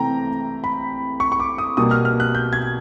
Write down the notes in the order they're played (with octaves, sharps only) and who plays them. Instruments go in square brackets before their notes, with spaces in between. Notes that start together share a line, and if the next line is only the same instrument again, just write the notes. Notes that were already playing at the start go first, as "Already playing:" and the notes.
Already playing: [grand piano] C3 E3 A3 G5 A#5
B5
C#6
C#6
D6
D#6
B2 G3 A#3 D#6
F6
F6
F#6
G6
G#6